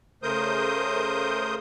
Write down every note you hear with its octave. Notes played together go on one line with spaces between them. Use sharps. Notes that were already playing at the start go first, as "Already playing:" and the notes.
C#3 A3 A#4 C5 D#6 G6